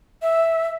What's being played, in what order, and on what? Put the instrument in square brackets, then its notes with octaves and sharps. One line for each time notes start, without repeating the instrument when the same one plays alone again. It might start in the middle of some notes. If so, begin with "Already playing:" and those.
[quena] E5